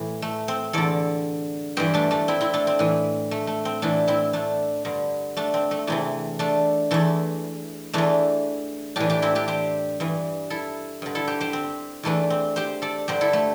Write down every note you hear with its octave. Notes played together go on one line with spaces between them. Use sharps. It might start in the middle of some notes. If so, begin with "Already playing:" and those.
Already playing: A2 E3
A3
C4
E2 D3 A4 D5
G2 E3 G4 C5
A3 D4
A3 D4
C4 E4
C4 E4
A3 D4
C4
A2 E3
A3
A3
C4
A2 E3 A3 D4
C4 E4
A3 D4
G2 D3
A3 D4
C4
A3
E2 C3 E3 A3
A3 D4
E2 E3 A3
E2 E3 A3 D4
A2 E3 D4 G4
D4 G4
C4 E4
D4 G4
G4 C5
G2 E3
E4 A4
G2 D3
E4 A4
G4 C5
G4 C5
C4
E2 E3 A3 D4
C4
G4 C5
A4 D5
G2 D3 G4 C5
E4 A4
A3